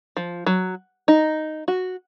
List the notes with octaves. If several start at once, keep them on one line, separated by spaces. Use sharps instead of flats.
F3
F#3
D#4
F#4